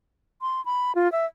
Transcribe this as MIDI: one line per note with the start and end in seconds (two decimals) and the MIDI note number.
0.41 0.64 84
0.65 0.95 83
0.95 1.10 65
1.12 1.25 76